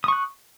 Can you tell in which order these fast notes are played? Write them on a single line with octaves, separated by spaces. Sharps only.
D#6 C#6 F#6